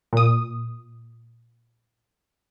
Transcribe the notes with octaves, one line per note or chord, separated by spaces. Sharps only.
A#2 D#6